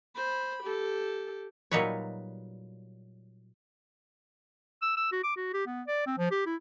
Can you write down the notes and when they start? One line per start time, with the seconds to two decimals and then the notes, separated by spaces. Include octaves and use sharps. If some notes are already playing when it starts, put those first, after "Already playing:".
0.15 C5 B5
0.63 G4 A4
1.71 A#2 F#3 G3 D#4 B4 C#5
4.82 E6
4.97 E6
5.12 F#4
5.24 D6
5.37 F#4
5.53 G4
5.66 B3
5.87 D5
6.07 C4
6.18 F3
6.31 G4
6.46 E4